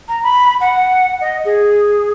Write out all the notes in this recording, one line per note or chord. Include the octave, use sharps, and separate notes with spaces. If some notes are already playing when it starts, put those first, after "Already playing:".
A#5
B5
F#5
D#5
G#4